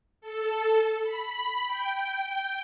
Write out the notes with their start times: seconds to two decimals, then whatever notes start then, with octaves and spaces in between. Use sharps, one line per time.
0.21 A4
1.02 B5
1.67 G5